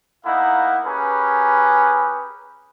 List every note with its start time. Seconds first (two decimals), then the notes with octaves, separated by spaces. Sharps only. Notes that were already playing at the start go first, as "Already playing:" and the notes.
0.25 A#3 B3 D#4 E4 F5 F#5
0.86 C#4 G4 G#4 A#4 B4